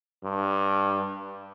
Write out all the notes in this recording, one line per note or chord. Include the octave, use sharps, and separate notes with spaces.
G2